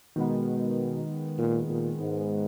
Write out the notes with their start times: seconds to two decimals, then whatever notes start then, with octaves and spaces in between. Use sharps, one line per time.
0.16 B2 D#3 G#3 B3
1.38 A#2
1.69 A#2
2.00 G#2